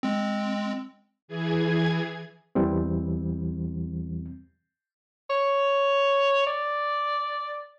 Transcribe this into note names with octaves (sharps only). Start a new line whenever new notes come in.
G#3 C4
E3 G#4 G#6
E2 E3 G3 C4
C#5
D5